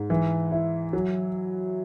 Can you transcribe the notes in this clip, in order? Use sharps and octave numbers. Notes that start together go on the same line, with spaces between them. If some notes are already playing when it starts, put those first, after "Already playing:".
Already playing: G#2
E3
E4
F#3